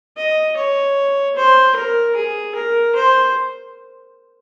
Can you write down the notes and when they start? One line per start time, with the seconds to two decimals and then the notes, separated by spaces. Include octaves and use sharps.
0.16 D#5
0.56 C#5
1.35 C5
1.76 A#4
2.16 G#4
2.55 A#4
2.95 C5